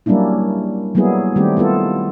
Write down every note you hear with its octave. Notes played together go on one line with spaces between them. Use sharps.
F#3 G3 A#3 C#4 D4 E4
F#3 G3 A#3 B3 E4 G#4
D#3 G3 A3 C4 G4
B3 E4 F4 A4